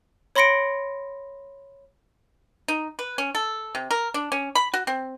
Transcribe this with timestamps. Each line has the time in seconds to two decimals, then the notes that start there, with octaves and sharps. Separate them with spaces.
0.36 C#5 B5 C6 A#6 C#7 D7
2.68 D#4
2.99 B4
3.18 C#4
3.35 A4
3.75 C3
3.91 A#4
4.14 D4
4.32 C#4
4.55 B5
4.74 F#4
4.87 C4